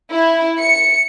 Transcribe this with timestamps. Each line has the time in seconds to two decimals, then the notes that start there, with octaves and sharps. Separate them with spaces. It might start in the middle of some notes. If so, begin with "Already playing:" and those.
0.11 E4
0.60 C#7